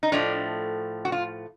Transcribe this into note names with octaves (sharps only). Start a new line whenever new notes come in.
D#4
A2 F3 A3 D4
F#4
F4